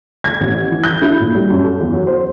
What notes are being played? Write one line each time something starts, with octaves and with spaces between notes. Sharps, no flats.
G#6
A1
E3
G6
E4
A#2
G3
F#2
A4
E2
F#3
C5